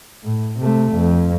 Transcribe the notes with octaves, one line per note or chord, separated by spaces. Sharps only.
A2
C3 A3
F2